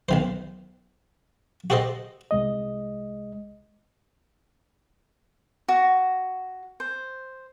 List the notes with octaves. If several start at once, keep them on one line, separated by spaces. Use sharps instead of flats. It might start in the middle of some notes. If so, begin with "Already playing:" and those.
B1 D#3 C5
F#4 G4 A4 C5 D#5
C2 G#3 D#5
F#4
C5